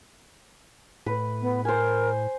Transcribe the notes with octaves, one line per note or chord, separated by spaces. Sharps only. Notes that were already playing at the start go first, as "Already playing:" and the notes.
A2 B4
B3
A#4 C5 G#5